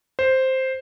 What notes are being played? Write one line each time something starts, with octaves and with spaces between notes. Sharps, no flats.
C5